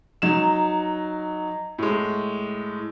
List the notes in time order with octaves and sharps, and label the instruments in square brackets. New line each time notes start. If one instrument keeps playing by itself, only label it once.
[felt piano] F#3 D#4 E7
A2 G#3